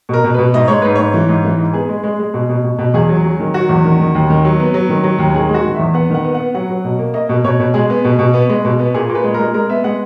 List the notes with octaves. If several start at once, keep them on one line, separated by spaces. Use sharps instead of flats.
B2 A#4
B2
B2 B4
G#2 D#5
G#3 C#5
G#2 B4
G#2 C#5
E3
G#2
E3
G#2
B3 G#4
G#3
G#3
G#3
B2
B2
B2
B2
E2 G#4
F#3
F#3
D#3
F#3 F#4
E2
D#3
D#3
D#2
D#3
F#3
B3
F#3
D#3
F#3
D#2
D#3 G#4
G#3
F#4
D#3
E5
E2
B3 F#5
D#3 F#5
B3
F#5
B3
F#3 F#5
F#3
B2
A#3
A#3 D#5
B2
B2 C#5
B2
G#3 G#4
B3
B2
B2
B3
G#3
B2
B3
A#2 G#4
A#2
B4
G#3
G#3 A#4
G#3 A#4
B3 E5
G#3 F#5